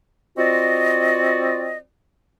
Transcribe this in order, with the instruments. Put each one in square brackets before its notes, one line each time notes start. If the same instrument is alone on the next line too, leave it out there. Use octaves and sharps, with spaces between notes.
[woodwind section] C4 F4 F#4 D5 D#5